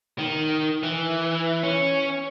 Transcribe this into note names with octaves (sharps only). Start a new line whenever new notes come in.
D#3
E3
C#4